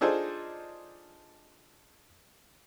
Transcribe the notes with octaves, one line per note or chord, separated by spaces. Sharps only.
D4 D#4 F4 G#4 A4 C5